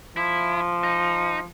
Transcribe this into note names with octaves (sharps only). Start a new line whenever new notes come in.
F3 E4
D#4